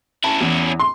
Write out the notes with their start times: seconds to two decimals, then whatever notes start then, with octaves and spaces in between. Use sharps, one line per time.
0.24 C#4 E4 A5
0.41 E2
0.79 C6